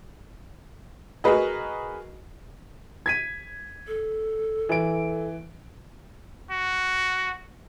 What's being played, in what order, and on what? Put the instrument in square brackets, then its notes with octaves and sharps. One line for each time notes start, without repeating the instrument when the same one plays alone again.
[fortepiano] F#4 G#4 A#4 B4 D#5
[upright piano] G#6 B6 D#7
[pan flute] A4
[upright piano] E3 D7
[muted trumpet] F#4